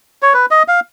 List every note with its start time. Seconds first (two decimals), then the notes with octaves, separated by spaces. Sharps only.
0.22 C#5
0.34 B4
0.51 D#5
0.68 F5